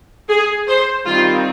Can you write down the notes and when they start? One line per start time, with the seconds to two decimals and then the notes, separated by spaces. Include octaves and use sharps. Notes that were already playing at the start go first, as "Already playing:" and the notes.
0.29 G#4
0.67 C5
1.05 D#3 G3 C4 F4